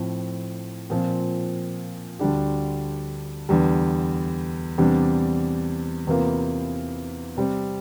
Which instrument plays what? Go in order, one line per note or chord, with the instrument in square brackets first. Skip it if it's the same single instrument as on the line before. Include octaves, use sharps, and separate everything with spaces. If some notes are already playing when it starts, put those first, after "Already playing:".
Already playing: [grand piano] A2 F3 C4
A#2 F3 C4
D2 D3 G3 D4 G4
E2 D3 G3
E2 C3 G3 D4
E2 C3 E3 A#3 F4
C3 G3 C4